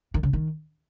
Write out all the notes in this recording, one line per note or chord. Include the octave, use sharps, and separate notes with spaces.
D#3
C#3
D#3